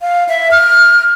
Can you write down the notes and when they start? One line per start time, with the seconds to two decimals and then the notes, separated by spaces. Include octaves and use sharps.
0.01 F5
0.29 E5
0.51 F6